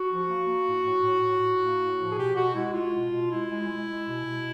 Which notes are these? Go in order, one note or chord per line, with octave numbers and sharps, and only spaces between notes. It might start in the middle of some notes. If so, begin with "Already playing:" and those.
Already playing: F#4
F3
A#3
A#3
A2
A2
A2
A2
A2
A#3
A2
F3
G#4
B2 G4
B2 F#4
G#3 E4
G#3 F4
B2
B2
G#3 E4
G#3
G#3
G#3
B2
B2